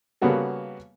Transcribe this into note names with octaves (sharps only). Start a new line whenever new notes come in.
C#3 G3 A#3 B3 F#4 A4